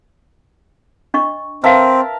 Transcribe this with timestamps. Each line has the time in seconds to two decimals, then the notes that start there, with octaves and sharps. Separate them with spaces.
1.14 D4 D#5 C#6
1.64 C4 A#4 B4 E5 F5 A5